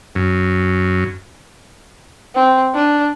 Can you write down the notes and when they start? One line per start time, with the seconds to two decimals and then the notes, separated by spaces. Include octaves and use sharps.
0.15 F#2
2.35 C4
2.74 D4